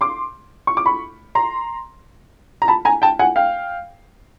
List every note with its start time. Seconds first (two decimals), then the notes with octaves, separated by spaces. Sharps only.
0.01 C6 D6
0.67 C#6
0.77 D6
0.86 B5 C#6
1.35 A#5 C6
2.62 A#5
2.68 A5 B5
2.85 G#5 A#5
3.02 G5 A5
3.19 F#5 G#5
3.36 F5 G5